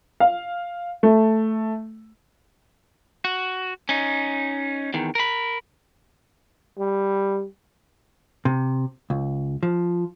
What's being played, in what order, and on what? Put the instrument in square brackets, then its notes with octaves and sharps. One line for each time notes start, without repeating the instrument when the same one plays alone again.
[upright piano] F5
A3
[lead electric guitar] F#4
C#4 D#4
E2 D#3
A#4 B5
[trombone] G3
[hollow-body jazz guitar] C3
C#2
F3